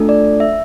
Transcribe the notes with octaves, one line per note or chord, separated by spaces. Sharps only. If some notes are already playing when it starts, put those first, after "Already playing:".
Already playing: A3 D4 F4 A4
D5
E5